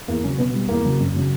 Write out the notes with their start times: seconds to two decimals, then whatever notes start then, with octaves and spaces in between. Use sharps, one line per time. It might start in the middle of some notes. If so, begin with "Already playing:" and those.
0.08 E2 A#3
0.24 C#3 F#3 C#4
0.38 B2 B3
0.54 G3
0.69 E2 A#3
0.85 C#3 F#3
1.00 F#2
1.16 C#3 F#3